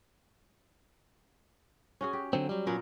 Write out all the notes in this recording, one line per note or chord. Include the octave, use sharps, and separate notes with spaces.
C#4 F#4 G#4
G4
D3 F#3 C4
F#3 G3
A#2 F#3 B3 C#4 A#4